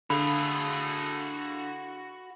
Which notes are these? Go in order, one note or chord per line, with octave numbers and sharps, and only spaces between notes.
D3 A3 F#4 G#4 F5 B5